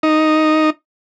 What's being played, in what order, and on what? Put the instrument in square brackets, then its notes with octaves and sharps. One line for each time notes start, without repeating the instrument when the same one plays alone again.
[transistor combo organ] D#4